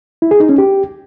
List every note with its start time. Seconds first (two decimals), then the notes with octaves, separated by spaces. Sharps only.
0.22 E4
0.31 G#4
0.40 D#4
0.49 C#4
0.58 G4